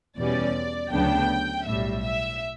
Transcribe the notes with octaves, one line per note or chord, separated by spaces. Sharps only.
E2 B2 G3 C#4 D5
D2 C#3 F#3 B3 D4 G5
B1 A2 G3 E5
E5